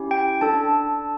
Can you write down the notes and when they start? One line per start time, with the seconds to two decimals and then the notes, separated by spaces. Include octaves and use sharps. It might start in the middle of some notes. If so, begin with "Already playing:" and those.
Already playing: C#4 E4 G4
0.11 G5
0.41 D4 A4 A5